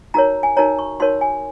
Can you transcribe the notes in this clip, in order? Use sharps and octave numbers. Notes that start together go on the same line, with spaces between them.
D#4 F#4 A#4 C#5 A#5
G#5
D#4 F#4 A#4 C#5 A#5
C#6
D#4 F#4 A#4 C#5 C6
G#5